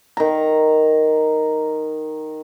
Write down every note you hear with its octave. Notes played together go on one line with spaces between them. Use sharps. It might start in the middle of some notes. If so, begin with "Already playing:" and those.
D#3 A#5